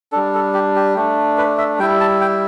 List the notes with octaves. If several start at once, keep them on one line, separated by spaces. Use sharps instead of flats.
G3 D4 A4
A4
G4
G4
A3 D4
B4
E5
G3 E4 G5
A5
G5